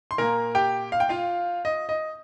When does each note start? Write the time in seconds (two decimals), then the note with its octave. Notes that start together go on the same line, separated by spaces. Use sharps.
0.11 C6
0.18 A#2 A#3 A#4 A#5
0.55 G4 G5
0.92 F5
1.00 G5
1.09 F4 F5
1.65 D#5
1.89 D#5